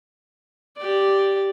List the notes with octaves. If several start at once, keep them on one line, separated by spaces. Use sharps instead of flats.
G4 D5